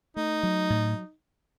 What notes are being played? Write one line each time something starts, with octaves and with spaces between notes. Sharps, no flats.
A3 D#4
F#3
A2